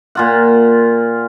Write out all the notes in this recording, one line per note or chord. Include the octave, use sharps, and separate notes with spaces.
A#2 F4 F#5